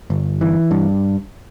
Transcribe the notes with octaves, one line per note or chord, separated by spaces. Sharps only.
G1
E3
G2